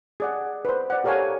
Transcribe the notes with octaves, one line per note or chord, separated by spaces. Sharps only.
G#4 D5 F#5
B4 C5
D5 F#5
G4 A4 A#4 C#5 F5 G#5